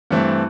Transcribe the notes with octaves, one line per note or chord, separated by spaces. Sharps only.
G2 E3 A3 C4